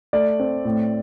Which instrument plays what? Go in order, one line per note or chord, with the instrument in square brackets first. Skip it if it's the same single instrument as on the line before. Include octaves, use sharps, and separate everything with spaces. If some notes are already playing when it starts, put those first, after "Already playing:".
[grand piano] A3 D5
C4
A2